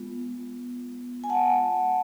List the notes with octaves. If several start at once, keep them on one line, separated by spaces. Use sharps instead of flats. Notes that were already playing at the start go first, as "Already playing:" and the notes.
Already playing: G#3 B3 F4
G#5
F#5 A5